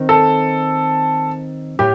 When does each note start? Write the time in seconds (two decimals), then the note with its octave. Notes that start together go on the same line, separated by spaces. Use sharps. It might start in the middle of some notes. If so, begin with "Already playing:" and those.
Already playing: D#3 C4
0.09 A4
1.79 A2 G4